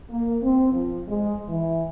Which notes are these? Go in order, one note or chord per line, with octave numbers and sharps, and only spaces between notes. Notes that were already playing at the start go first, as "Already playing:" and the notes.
A#3
C4
F3
G#3
E3